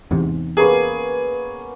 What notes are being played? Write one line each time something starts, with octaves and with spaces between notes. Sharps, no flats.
E2 G#2 C3
A#3 B3 C#4 G#4